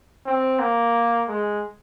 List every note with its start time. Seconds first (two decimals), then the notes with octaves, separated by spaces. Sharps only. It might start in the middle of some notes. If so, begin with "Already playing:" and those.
0.26 C4
0.60 A#3
1.28 G#3